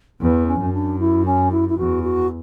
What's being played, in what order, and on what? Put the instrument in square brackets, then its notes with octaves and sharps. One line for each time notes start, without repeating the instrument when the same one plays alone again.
[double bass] E2 [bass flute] B3
[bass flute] C#4
[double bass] F#2
[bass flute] D4
E4
C#4
E4
E4
[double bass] E2 [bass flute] F#4
[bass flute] F#4